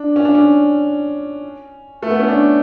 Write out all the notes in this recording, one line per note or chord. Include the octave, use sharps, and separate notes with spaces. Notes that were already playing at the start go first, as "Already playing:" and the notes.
Already playing: D4
C#4
D4
C#4
A3
B3
C#4
D4